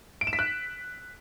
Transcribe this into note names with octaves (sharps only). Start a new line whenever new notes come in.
D7
E7
B6
F#6